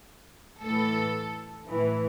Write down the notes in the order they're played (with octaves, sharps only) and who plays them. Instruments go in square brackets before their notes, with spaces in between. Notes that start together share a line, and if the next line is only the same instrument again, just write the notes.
[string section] A2 E3 A4
A2 E3